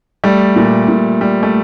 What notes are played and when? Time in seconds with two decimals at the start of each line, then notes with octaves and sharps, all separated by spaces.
0.24 G3 A3
0.56 A#2
0.88 A#2
1.21 G3
1.43 A3